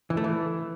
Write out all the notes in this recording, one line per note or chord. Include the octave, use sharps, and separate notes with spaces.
E3
A3
E3